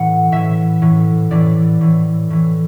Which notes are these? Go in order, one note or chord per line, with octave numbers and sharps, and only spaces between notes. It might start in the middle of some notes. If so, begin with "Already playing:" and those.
Already playing: A2 E3 F#5
A2 E3 E5
A2 E3
A2 E3 D5
A2 E3
A2 E3